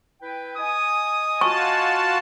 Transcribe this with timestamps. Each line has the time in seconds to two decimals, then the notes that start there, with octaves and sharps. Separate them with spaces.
0.22 E4 B4 G5
0.57 D#5 G#5 D#6
1.41 F4 F#4 A5 C#6